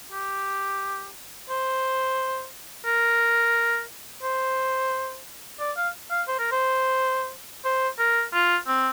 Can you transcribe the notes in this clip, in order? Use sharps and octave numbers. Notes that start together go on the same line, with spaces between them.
G4
C5
A#4
C5
D5
F5
F5
C5
A#4
C5
C5
A#4
F4
C4